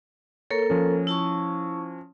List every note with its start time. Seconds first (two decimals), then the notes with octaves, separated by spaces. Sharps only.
0.50 A#3 A4 A#4 C#5
0.70 F3 C#4
1.07 E4 A5 C#6